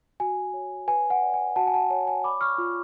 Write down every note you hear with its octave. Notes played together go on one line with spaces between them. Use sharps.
F#4 G#5
C#5
B4 G#5
F#5
D5
G#5
F#4 F#5 A5
G#5
F#5 A5
C#5 G#5
G#5
D5 B5 D6
C#6 F6
F4